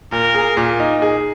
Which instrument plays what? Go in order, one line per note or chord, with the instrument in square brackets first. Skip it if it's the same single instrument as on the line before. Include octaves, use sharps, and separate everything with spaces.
[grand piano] A#2 [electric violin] A#4
[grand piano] G#4
A#2
D#4
G#4